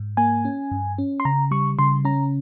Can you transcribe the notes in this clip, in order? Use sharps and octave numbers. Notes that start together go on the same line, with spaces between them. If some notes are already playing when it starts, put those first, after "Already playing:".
Already playing: G#2
A#3 G#5
C#4
G2
C#4
C6
C#3 A#5
G3 C#6
C#3 C6
C#4 A#5